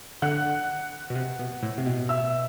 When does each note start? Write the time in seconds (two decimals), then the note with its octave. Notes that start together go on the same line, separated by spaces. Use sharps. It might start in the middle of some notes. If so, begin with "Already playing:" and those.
0.22 D3 F#5 F#6
1.10 B2
1.15 C3
1.39 B2
1.63 A2
1.78 C3
1.86 B2
2.09 E5 E6